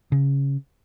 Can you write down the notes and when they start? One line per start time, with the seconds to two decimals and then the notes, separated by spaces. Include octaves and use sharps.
0.12 C#3